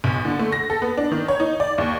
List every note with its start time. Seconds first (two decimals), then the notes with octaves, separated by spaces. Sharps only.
0.04 B1
0.25 D3
0.39 A3
0.52 A#6
0.70 A4
0.82 B3
0.97 D4
1.12 D#3
1.28 C#5
1.40 D#4
1.60 D5
1.78 D#2